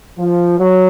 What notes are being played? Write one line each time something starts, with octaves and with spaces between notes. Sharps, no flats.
F3
F#3